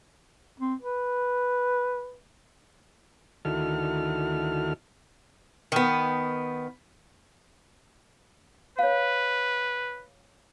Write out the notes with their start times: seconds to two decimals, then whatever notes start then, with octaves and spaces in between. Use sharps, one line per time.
0.60 C4
0.82 B4
3.45 D2 D#3 E4 F#4 A4 F6
5.72 D#3 B3
8.79 B4 C#5 F5